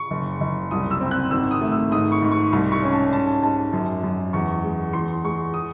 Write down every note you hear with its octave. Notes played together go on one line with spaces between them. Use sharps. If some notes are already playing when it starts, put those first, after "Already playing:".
Already playing: C#6
F#1
F#1
C2 D#6
E6
C4
F#6
G#1 E6
D#6
A3
E6
G#2 D#6
C#6
G#2
C#6
C2
C#6
C#4
A5
G#2 A5
G#2 A5
F#2
F#2
E2 C#6
G#3
E2 C6
G#3 C#6
D#6